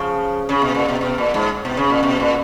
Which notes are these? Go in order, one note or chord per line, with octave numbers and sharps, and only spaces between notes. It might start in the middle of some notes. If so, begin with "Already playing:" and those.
Already playing: C#3 F3
C#3
B2
A#2
B2
B2
A#2
G#2
B2
C#3
A#2
B2
A#2